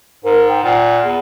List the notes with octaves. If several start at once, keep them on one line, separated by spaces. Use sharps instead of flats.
G#2 A#4
G5
A#2 F#5
E2